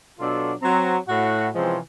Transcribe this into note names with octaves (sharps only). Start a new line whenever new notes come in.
B2 F#3 D4 F4 A4
F#3 C4 A#5
A2 F#4
C3 E3 F3 G#3 C4 C#4